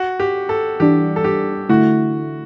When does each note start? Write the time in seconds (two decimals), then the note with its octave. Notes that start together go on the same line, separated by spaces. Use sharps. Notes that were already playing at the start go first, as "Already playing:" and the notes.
Already playing: F#4
0.20 G4
0.49 A4
0.80 E3 G3 D4 G4
1.16 A4
1.24 G4
1.69 D3 A3 E4 F#4